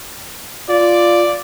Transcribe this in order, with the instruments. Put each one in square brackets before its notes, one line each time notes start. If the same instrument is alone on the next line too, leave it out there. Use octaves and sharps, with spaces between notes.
[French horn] F4 [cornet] D5